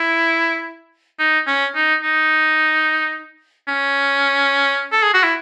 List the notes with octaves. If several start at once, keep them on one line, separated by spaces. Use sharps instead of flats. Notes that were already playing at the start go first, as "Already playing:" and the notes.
Already playing: E4
D#4
C#4
D#4
D#4
C#4
A4
G#4
F#4
E4